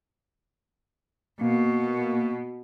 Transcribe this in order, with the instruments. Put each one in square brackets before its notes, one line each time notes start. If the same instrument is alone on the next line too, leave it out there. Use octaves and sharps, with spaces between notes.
[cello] B2 [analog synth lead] A#3